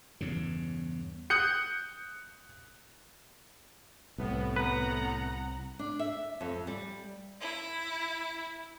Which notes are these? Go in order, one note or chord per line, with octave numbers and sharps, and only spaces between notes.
E2 G2 C#3
D#6 F#6 G6 C#7
C2 A2 B3
B4 F#5 A#5
D4
E5
F2
G3
E4